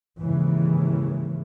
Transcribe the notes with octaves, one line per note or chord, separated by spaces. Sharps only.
D#2 G#2 C#3 E3